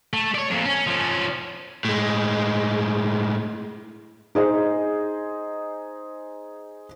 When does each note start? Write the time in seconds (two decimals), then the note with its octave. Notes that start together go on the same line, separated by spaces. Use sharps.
0.14 A3
0.35 C#5 D5
0.50 F2 A#2
0.66 C#4
0.87 F3 C#4
1.85 A2 G#3
4.35 D#4 G#4 C5 D#5